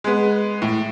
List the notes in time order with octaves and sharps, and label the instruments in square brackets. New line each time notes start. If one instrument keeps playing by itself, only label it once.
[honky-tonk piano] G#3 B3
A2